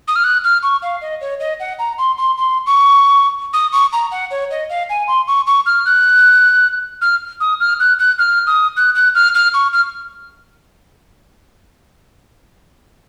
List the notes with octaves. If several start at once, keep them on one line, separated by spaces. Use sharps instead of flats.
D#6
F6
F#6
F6
C#6
F5
D#5
C#5
D#5
F#5
A#5
C6
C6
C6
C#6
D#6
C#6
A#5
F#5
C#5
D#5
F5
G#5
C6
C#6
C#6
F6
F#6
F6
D#6
F6
F#6
F#6
F6
D#6
F#6
F#6
F6
F6
C#6
F6